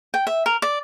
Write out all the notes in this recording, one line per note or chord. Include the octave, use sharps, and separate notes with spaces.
G5
E5
A#4
D5